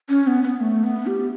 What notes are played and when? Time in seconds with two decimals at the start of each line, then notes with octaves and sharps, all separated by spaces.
0.09 C#4
0.27 B3
0.43 B3
0.61 A3
0.84 B3
1.07 G4